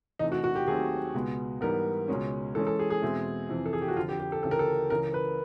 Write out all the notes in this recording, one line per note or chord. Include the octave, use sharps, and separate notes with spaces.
E2 C3 E3 A3 D#4
F#4
F#4
G4
D#2 D#3 F#3 A3 C4 G#4
C#2 B2 G#3 B3
G#2 E3 G3 B3 A#4
C#2 B2 G#3 C#4
E3 G#3 C#4 A4
A4
G#4
G#4
E2 B2 G#3 C4 E4
F2 C3 E3
A4
G#4
G4
F#4
F2 D3 F3 F4
G4
G4
A4
D2 C#3 E3 A4
A#4
A4
C#2 C#3 E3 A#4
B4